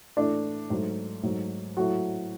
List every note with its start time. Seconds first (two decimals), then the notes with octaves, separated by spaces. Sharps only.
0.17 A2 E3 A3 D4
0.70 G#2 F#3 A3
1.23 G#2 F#3 A3
1.77 A2 F#3 A3 F#4